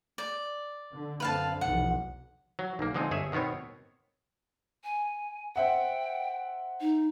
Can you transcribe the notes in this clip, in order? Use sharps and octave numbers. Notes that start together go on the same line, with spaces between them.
D5
D3
F#2 D3 C4 B4 F5 A5
F1 B1 E2 F#5
F#3
B1 A#3
D3 F3 G#3 C4 D#4
G1 G#4 C#5 E5
B2 D#3 B3 C4 C#5
G#5
C5 E5 F#5 G5
D#4